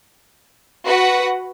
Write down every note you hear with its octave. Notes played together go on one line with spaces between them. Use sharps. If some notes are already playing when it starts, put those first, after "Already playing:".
F#4 B4 F#5